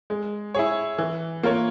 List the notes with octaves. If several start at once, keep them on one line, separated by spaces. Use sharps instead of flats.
G#3
E4 G#4 C#5
E3
A#3 F4 A#4 C#5